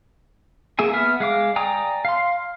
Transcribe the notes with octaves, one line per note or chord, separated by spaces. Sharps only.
A#3 G#4 E5 G#5
B3 E5 F6
G#3 F5 D6
D5 G5 G#5 A#5 D#6
F5 C6